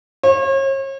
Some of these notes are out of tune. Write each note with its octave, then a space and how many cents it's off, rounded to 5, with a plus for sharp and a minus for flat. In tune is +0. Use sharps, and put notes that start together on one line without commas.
C#5 -40